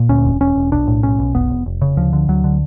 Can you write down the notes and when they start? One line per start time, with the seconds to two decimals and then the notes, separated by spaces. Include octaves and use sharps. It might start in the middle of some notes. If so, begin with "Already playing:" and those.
Already playing: A#2
0.09 D2 C#4
0.25 E1
0.40 E1 C#4
0.56 E1
0.72 B1 D4
0.87 A2
1.03 B1 C#4
1.19 B1
1.35 F1 B3
1.50 F1
1.66 F1
1.82 C#3
1.97 D2 F3
2.13 D3
2.28 D2 F#3
2.44 D3